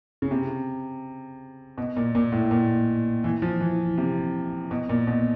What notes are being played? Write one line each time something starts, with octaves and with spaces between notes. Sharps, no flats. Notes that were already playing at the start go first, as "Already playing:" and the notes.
C#3
C3
B2
A#2
A#2
A2
A#2
E3
F3
E3
C3
B2
A#2
B2